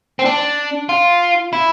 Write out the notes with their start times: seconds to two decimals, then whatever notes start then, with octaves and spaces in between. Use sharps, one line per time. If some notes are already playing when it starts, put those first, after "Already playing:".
0.19 C4
0.25 D4
0.89 F4
1.53 E4